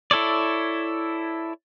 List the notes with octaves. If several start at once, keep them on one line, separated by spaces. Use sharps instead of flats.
E4 A4 C#5 D5